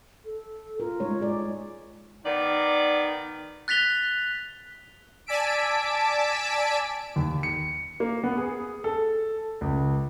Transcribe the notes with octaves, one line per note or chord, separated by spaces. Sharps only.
A4
F4 A#4
G#3 D#4 C#5
G#4 D5
D#3 B3 D5
F#6 A6 B6 F7 G7
D5 G#5 A5 E6 B6 D7
D#2
C#7
A#3
B3
G#4
A4
C#2